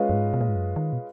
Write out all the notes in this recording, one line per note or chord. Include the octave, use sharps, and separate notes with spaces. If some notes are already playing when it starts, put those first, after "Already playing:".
Already playing: G#3 C#4 F4 B4 D#5
F#2
G#2
B2
A#2
G#2
F#2
D#3
B2